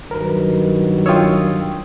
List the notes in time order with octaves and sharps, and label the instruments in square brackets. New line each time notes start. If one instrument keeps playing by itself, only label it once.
[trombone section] G2 D#3 F#3 [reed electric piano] A#4 B4
[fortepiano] F4 C#5 [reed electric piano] G5 D#6 E6